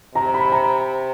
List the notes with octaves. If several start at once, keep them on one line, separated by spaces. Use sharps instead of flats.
C3 A#5
B5
A#5